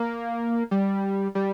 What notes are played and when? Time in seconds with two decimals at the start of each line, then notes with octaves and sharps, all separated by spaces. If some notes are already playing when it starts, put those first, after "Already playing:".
Already playing: A#3
0.71 G3
1.35 G3